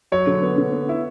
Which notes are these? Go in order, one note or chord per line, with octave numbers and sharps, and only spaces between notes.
F#3 C#5
D3
B3
D3
B3
E4